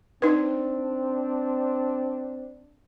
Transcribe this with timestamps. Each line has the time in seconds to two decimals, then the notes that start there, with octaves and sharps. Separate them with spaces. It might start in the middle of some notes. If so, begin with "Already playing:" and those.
0.22 C4 D4 D#4 B4